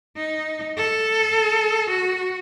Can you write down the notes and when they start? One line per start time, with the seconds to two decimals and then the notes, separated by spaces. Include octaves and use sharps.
0.16 D#4
0.77 A4
1.90 F#4